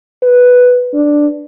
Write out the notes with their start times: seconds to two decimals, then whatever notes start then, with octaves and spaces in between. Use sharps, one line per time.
0.23 B4
0.94 D4